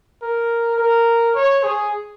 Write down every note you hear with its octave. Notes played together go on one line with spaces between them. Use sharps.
A#4
A#4
C#5
G#4